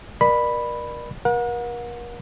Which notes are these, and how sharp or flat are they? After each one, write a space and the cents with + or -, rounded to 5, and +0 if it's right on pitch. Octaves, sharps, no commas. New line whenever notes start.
A#4 +35 D5 +35 B5 +0
A#4 +40 F#5 -40